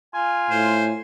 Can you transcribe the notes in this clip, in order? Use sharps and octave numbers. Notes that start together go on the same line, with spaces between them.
F4 G#5
A2 C5